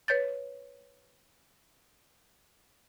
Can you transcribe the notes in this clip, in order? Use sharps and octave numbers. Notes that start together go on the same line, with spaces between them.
B4 C#5 G6 A6